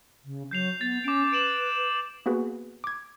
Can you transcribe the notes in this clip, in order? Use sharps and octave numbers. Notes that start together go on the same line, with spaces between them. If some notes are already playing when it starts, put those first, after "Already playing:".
C#3
F#3 G6 C7 F7
B3 A6 F7
C#4 D6 D7
B4 D7 E7 F#7
A#3 B3 F#4 G#4 B4
D6 G#6